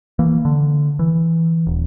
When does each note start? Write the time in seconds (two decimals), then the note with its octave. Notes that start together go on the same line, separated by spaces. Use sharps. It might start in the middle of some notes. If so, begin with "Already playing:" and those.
0.19 E3 A#3
0.45 D3
0.99 E3
1.67 D#1